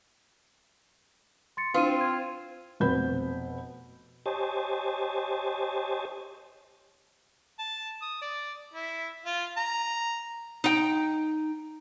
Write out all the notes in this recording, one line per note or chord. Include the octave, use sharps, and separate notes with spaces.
C6 A6 C#7
C4 D4 E4 F4 D#7
G#6
F1 B2 C4 B5 G6
G4 C5 C#5 D#5 G#5 A5
A5
D#6
D5
E4
F4
A#5
D#4 G5